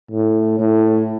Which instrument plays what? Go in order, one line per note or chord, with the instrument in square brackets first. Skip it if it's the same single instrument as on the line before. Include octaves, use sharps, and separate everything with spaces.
[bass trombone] A2
A2